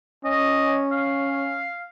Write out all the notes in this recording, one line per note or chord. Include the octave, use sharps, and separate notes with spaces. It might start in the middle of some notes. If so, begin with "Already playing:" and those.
C#4 D#5
F5